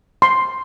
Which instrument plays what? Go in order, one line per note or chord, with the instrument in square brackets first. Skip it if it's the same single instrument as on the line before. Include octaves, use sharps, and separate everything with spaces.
[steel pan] C6